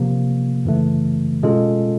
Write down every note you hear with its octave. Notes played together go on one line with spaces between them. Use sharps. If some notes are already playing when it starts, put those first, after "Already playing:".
Already playing: C3 F3 A#3
F#2 C#3 E3 A3
B2 G#3 C#4 F4 A4